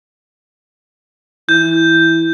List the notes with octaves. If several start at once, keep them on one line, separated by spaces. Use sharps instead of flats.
E3 G6